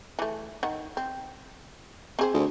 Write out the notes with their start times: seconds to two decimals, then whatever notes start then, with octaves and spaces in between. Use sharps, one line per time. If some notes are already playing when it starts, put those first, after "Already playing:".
0.19 E3 A3
0.63 D#3 F#5
0.97 C4
2.19 C4 G#4 C5
2.34 D2